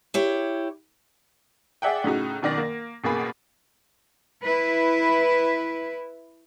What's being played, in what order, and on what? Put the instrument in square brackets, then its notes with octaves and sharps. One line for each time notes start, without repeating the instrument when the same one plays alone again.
[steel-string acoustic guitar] E4 G4 C#5
[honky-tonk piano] G#4 D5 E5 F#5 G5
A2 C#3 D#4 F#4
F#2 B2 D#3 D5 A#6
A#3
A1 B2 A#3 G#4 B5
[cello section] E4 B4